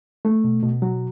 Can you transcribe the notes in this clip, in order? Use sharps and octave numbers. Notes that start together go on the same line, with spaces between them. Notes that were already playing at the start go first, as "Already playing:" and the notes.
A3
B2
B2
F#3